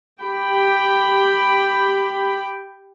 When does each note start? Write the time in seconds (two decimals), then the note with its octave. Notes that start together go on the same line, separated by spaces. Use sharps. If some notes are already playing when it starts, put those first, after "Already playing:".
0.20 G4 G5 B5